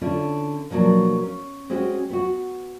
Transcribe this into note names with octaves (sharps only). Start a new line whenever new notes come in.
D3 C#4 E4 F4
B2 F3 F#3 A#3 D4
C#4
G#3 C4 C#4 F#4 G4
B3 F#4